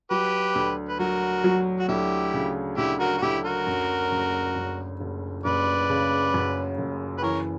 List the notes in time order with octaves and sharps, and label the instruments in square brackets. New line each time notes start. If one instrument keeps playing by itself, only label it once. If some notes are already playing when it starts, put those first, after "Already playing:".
[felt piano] F#3 [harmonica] G4 B4
[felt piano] D2
[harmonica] B4
[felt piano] F#3 [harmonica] F#4 A#4
[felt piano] F#3
[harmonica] F#4
[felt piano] D2 [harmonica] E4 G4
[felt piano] C#3
[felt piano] D2 [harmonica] E4 G4
[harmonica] F#4 A#4
F#4
[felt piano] D2 [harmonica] E4 G4
[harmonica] F#4 A#4
[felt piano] F#2
F#1
F#2
F#1
[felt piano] F#1 [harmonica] B4 D5
[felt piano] C#3
F#2
F#1
[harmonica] B4
[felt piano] E3 [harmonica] A#4 C#5